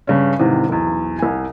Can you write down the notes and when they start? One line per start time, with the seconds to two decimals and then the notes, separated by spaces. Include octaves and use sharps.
0.07 G2 C#3 C#4
0.39 G#2 C3 D#3 E3
0.69 B1 E2
1.19 C2 G#5